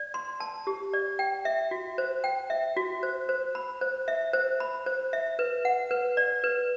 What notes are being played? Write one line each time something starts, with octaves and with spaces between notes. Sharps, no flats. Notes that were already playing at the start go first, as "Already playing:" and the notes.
Already playing: D5
C6
A5
G4
D5
G5
E5
F#4
C5
G5
E5
F#4
C5
C5
B5
C5
E5
C5
B5
C5
E5
B4
F#5
B4
D5
B4